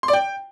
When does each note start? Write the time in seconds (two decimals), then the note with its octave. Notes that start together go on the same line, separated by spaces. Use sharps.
0.03 C6
0.08 D5
0.13 G5